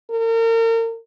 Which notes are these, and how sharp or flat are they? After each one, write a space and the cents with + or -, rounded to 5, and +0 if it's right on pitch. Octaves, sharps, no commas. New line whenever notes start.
A#4 -35